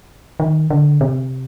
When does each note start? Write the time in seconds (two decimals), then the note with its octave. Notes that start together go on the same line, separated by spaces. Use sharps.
0.40 D#3
0.70 D3
1.01 C3